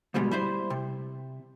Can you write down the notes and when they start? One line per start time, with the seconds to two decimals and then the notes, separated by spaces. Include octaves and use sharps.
0.14 D2 G#2 B2 G3 G#3
0.31 G3 E4 C5
0.70 C3